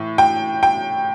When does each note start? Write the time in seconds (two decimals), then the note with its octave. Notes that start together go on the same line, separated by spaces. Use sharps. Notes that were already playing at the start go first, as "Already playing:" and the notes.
Already playing: A2 E3
0.18 G5
0.63 G5